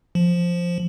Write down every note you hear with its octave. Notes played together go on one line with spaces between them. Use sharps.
F3